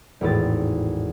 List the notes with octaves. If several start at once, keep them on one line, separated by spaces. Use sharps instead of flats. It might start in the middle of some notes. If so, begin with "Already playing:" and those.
G#1 E2 A2 A6